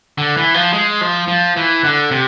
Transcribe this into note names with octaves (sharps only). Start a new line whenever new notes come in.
D3
E3
F3
G#3
F3
F3
E3
D3
C3